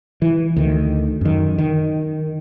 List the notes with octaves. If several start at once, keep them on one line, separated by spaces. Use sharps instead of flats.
E3
D2 D#3
F#2 D#3
D#3